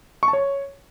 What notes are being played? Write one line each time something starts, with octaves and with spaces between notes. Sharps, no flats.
C#6
A5
C#5